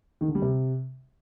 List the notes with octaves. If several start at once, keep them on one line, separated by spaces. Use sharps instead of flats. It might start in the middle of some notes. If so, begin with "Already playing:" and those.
D#3
D3
G3
C3